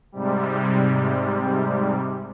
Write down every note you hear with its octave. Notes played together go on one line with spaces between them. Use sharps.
G#2 C3 G3